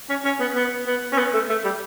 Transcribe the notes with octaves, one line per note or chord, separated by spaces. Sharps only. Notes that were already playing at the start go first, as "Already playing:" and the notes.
C#4
C#4
B3
B3
B3
C#4
B3
A3
A3
G3